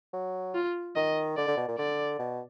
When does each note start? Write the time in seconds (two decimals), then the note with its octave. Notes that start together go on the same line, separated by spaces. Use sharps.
0.13 F#3
0.55 F4
0.96 D#3 D#5
1.37 D3 D5
1.48 D3
1.57 B2
1.68 A#2
1.78 D3 D5
2.19 B2